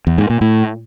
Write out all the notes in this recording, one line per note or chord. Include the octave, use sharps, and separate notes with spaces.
E2
G#2
A#2
A2